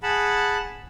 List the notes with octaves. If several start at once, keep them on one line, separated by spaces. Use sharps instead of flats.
G#4 F#5 A5 B5